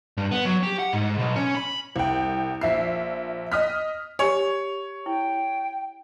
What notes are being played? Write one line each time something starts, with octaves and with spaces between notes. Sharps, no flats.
G2
B3
F#3
G4
F#5
G#2
B1
C#4
B5
C2 G5
A#1 E5 C7
D#5 D#6 F6 B6
G4 C#5 G#5
E4 G5